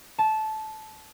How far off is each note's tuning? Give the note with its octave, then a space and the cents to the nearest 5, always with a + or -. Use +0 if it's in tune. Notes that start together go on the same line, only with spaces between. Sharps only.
A5 -15